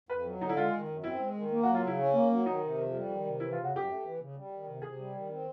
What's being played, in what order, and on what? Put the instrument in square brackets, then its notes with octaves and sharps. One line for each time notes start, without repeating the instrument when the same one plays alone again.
[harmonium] F2 [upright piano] B4
[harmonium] F#3
[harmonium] D3 [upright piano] D#4
[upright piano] E4
[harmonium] G#3 [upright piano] F4
[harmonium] D#3
F#2
[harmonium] C4 [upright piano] E4
[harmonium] G#3
D#3
A#3
[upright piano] F#4
[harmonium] F#3
[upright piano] F4
[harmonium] C#3 [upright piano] E4
[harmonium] C#4
A#3
F#3
[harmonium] D#3 [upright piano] D#4
[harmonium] C3
F2
G3
D#3
C3
[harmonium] E3 [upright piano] E4
[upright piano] F4
[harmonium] C#3
[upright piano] F#4
[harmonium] F#2 [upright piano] G4
[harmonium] A3
E3
C#3
G3
D#3
C3
[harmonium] C3 [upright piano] G#4
[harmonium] G3
D#3
C4